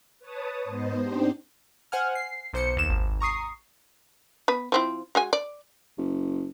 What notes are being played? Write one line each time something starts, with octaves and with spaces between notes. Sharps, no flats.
B4 C#5 A5 D#6
G#2 B3 C5 D#5
C4 D4 D#4 G4 C5
C5 F#5 G#5 F6
C7
B1 C5 C#7
D#2 E7
G#1
A#5 C#6 D#6 C7
B3 B4
F3 C4 E4
G#3 F#4 G#5
D5
F#1